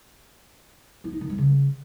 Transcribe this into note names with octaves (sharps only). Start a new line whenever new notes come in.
E4
D#4
D#3
G3
C#3